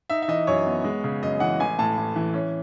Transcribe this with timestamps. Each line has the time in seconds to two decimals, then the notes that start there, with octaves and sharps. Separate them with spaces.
0.10 D#4 E5
0.22 E5
0.28 E3 D#5
0.47 F#2 C#5
0.67 B3
0.84 G#3
1.04 C#3
1.23 F#2 D#5
1.40 E3 F#5
1.60 A1 G#5
1.79 A2 A5
1.97 A1
2.16 E3
2.34 C#4